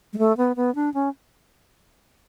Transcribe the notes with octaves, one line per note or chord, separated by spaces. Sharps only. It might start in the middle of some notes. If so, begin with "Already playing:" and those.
G#3
A3
B3
B3
D4
C#4